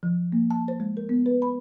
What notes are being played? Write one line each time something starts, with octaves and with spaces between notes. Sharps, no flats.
F3
A#3
A5
C5
G#3
A#4
B3
B4
B5